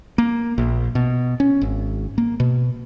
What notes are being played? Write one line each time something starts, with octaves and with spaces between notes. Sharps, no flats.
A#3
A#1
B2
C#4
G#1
A#3
B2